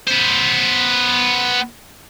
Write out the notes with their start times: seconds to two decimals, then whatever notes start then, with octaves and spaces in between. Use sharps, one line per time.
0.07 B3 C5